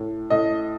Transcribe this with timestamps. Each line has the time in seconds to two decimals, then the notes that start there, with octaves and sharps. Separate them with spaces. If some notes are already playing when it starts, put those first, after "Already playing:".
Already playing: A2
0.30 A2 D#5